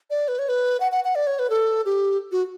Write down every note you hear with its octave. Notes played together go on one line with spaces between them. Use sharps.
D5
B4
C#5
B4
F#5
F#5
F#5
D5
C#5
B4
A4
G4
F#4